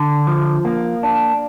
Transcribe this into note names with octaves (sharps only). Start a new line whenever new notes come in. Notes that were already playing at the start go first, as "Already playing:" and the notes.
Already playing: D3
F3
A#3
D4